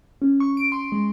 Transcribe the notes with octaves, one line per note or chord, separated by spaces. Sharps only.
C#4
C#6
D7
C6
G#3